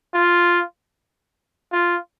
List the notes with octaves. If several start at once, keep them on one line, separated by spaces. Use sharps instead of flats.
F4
F4